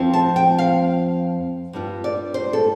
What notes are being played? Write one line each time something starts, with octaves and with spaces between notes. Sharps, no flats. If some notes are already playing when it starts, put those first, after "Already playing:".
Already playing: F2 F3 C4 F4
A5
G5
F5
G2 G3 D4 F4
D5
C5
A4